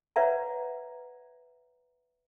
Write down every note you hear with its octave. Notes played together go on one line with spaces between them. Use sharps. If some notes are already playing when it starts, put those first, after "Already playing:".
B4 C#5 D5 E5 F#5 A#5